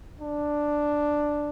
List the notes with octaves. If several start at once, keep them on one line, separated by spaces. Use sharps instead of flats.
D4